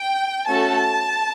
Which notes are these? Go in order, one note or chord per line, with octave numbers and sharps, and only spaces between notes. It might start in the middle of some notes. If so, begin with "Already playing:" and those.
Already playing: G5
A3 C#4 F#4 A4 A5